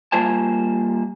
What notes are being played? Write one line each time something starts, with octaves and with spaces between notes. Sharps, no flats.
G3 A#3 F4 C5 G#5 A5